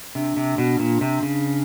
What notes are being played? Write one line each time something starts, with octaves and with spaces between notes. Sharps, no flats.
C3 D4
C3
B2
A#2
C3
C#3